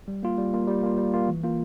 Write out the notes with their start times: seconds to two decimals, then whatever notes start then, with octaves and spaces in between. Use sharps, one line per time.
0.08 G3
0.23 A#3 F4
0.38 G3
0.53 A#3 F4
0.67 G3
0.83 A#3 F4
0.97 G3
1.14 A#3 F4
1.29 E3
1.44 A#3 F4